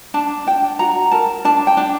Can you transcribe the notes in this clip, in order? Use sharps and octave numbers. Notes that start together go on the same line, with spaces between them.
D4 A5
D4 G5
F#4 A#5
A#4 A5
D4 A5
G5
D4